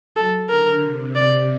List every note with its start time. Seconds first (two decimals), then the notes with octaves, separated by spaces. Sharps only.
0.16 F#3 A4
0.49 D3 A#4
0.82 C3
1.15 D5